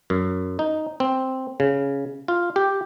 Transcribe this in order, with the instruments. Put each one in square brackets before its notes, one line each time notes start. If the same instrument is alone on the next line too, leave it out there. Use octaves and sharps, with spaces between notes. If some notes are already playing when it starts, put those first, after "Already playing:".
[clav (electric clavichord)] F#2
D#4
C4
C#3
F4
G4